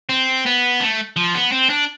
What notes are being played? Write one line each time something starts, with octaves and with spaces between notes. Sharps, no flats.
C4
B3
A3
F3
B3
C4
D4